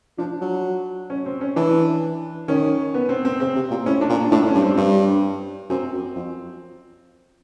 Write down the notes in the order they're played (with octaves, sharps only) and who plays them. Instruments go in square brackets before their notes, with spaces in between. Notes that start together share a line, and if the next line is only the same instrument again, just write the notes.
[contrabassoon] F3 [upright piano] D4
[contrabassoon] F#3
[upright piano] C#4
C4
C#4
[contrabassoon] E3 [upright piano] D4
[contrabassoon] D#3 [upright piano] C#4
[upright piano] B3
C4
C4
[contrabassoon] C#3 [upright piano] C4
[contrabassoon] C3
A#2
[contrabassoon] A2 [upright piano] C#4
[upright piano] D4
[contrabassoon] A#2
[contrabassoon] A2 [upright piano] D4
[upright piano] C#4
[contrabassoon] G2
[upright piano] C4
[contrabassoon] G2
[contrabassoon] F#2 [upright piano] C4
[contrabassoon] F#2
F2